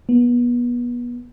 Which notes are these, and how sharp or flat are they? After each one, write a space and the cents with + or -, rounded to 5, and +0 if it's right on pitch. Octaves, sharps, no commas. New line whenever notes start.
B3 -30